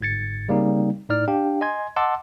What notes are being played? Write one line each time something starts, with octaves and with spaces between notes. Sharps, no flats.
G1 G#2 G#6 A6 C#7
C#3 G3 A#3 C4 D#4
A2 D#4 D5 F6
D4 G4 F5 G5
D#5 G#5 C6 G#6
D#5 F#5 A5 C6 D6 E6